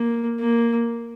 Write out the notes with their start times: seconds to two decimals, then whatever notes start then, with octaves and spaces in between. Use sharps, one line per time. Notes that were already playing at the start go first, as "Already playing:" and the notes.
Already playing: A#3
0.40 A#3